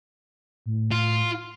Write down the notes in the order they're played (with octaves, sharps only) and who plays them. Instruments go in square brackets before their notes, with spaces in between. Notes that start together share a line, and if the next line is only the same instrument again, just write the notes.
[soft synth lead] A2
[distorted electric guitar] F4